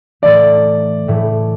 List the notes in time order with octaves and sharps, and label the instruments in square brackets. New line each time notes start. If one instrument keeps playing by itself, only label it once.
[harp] A2 E3 A3 [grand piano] D5
[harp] A2 E3 A3